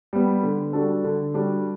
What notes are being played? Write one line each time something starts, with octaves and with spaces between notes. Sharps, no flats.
G3 B3
D3
G3 D4 F#4 A4
D3
G3 D4 F#4 A4